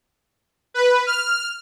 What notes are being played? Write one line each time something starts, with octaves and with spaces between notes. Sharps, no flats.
B4
F6